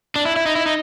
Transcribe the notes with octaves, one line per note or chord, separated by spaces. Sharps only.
D4
E4
E4
D#4
E4
D#4